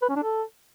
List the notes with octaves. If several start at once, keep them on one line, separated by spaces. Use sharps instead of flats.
B4
C#4
D4
A4